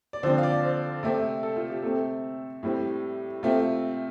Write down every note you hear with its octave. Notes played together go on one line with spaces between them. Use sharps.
D5
D3 F3 C4 C5
F5
D5
C5
C3 A3 C4
A4
F4
G4
C3 A3 C4 A4
A2 G3 C4
C3 A3 C4 F4